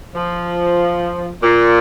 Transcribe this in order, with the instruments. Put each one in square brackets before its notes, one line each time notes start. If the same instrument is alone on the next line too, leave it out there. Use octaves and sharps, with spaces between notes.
[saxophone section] F3
A#2